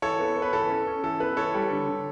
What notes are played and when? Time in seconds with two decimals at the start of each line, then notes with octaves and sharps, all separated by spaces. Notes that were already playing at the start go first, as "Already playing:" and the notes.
0.02 E3 A4 C#5
0.19 B3
0.36 B3
0.42 B4
0.53 E3 A4
0.70 C#4
0.87 C#4
1.03 E3 A4
1.20 B3 B4
1.37 E3 A4 C#5
1.54 G3
1.71 D3
1.88 D3